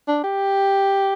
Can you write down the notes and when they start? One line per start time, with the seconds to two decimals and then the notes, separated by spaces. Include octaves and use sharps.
0.08 D4
0.24 G4